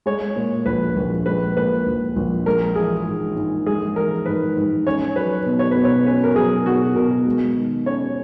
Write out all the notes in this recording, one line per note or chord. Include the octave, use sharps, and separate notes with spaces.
G#3 C#5
A#2
A#1 B4
A#1
G#3 B4
A#2 B4
A#1
A#1
G#3 A#4
E3 G#4
G#2
G#2
G#3 G#4
E3 A#4
G#2 B4
G#2
C#4 C#5
F#3 B4
B2
C#5
B2 B4
C#5
C#4 B4
A#4
F#3 G#4
B2 F#4
B2 A#4
G#3
D#3
C#4 C#5